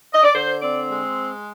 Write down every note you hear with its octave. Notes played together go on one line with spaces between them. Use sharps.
D#5
D5
D3 C5
C4 D5
G#3